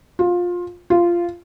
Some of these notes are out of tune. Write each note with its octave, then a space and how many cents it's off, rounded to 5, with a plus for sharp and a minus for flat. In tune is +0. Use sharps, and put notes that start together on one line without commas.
F4 +20
F4 -10